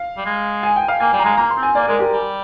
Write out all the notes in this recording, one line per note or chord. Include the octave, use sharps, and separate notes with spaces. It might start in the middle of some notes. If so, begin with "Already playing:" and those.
Already playing: F5
G3
G#3
G#5
G5
F5
A#3 G#5
G3
A#5
G#3
A#3 A#5
C6
C4
G#5
A#3 D5
G#3 A#4
G4
G3